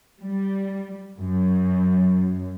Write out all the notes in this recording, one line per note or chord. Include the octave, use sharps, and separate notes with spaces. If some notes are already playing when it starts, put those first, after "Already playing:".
G3
F#2